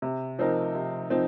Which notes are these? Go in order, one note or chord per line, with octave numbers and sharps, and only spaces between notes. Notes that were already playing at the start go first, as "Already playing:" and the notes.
C3
F3 C4 D#4 A#4
C3
F3 C4 D#4